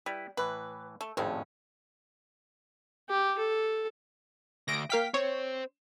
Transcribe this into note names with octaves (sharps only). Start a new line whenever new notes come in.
G3 E4 B4
A2 E3 B4
A3
G#1 F2 A2 C3 C4 C#4
G4
A4
D2 A#6 D7
A#3 F5 G5 B6
C4 C5 C#5